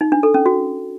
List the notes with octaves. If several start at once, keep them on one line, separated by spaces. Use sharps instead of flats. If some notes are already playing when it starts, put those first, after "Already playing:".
D#4
D4
A4
C#4
F#4